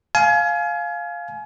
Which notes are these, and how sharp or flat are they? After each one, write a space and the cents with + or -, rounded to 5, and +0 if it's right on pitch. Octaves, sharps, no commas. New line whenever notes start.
F5 +0 G#5 +30